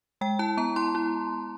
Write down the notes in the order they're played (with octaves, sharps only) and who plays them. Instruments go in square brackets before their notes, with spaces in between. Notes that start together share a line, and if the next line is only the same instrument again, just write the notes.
[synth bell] G#3 G5
E4 A5
B3 A#5
E4 C6
E4